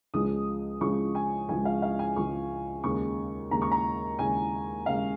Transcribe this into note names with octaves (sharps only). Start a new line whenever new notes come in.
C#2 C#3 F3 G#3 D#6
C#2 C#3 F3 G#3 C#6
G#5
C#2 C#3 F3 G#3 G#5
F5
F5
G#5
C#2 C#3 F3 G#3 C#6
D#2 C#3 G#3 C#6
D#2 C#3 G#3 A#5
C#6
A#5
D#2 C#3 G#3 G#5
D#2 C#3 G#3 F5